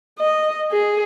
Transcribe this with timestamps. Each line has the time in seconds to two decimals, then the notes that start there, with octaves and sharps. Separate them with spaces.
0.19 D#5
0.72 G#4